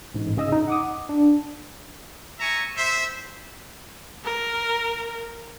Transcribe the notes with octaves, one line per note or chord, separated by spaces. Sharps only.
A1 G#2
C#3 G#4 D#5 D#6 E6
D#4
F#5 D6 D#6
D4
E5 G#5 A#5 C#6
C5 E5
A#4